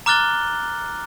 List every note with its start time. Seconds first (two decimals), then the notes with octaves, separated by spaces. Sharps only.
0.06 A#5 D6 F6 F#6 A6 G7